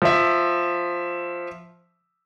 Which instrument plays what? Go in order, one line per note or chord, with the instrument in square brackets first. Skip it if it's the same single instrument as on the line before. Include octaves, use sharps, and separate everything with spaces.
[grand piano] F3 E5